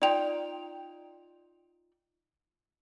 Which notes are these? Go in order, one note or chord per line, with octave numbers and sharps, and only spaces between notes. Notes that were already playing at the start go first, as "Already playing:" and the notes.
D#4 F4 D5 G5 F7